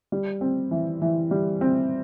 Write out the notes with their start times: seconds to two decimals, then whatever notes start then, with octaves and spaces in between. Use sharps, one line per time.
0.12 G3
0.41 C4
0.71 E3
1.02 E3
1.31 G3
1.61 C4